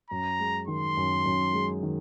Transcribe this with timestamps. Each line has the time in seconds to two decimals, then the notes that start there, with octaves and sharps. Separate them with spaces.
0.10 F#2 A#5
0.39 G#3
0.68 D#3 C6
0.97 F#2
1.26 F#2
1.53 G#3
1.83 D#3